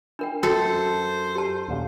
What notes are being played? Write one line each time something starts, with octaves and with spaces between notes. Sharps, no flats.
D4 A#4 G5
F#2 F#4 A4 C5
G4 A5
D#2 A#2 C#3